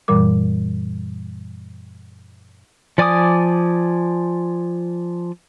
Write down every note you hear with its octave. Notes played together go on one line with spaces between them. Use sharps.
F#2 A#2 E3 G3 A#4 D6
F3 D5 G#5 D6 D#6